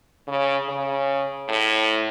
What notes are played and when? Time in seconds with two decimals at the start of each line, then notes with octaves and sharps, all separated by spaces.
0.28 C#3
0.69 C#3
1.49 A2